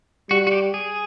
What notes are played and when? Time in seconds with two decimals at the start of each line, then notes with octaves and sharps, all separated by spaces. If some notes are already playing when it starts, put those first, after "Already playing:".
0.31 G3 F#4
0.47 F#4
0.52 G4
0.74 G#4